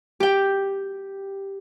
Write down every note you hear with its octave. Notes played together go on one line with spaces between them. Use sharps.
G4 G5